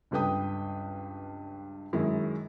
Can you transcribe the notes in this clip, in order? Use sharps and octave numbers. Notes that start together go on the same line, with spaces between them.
C#2 G2 A4 B4 G5 D#6
F#2 D#3 G#3 D#4 E4